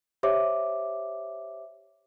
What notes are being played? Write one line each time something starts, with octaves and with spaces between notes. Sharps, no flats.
G4 C5 C#5 E5 D6